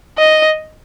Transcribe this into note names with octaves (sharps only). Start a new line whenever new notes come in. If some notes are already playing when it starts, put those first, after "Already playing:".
D#5